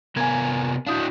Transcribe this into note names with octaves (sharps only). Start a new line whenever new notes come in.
C3 B3 A#4 G#5 G#6
D4 E4 F#4 F5 D#6 G6